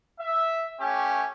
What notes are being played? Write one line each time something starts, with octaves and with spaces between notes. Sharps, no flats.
E5
A3 C#4 G4 G#5